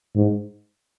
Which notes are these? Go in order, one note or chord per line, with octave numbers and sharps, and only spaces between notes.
G#2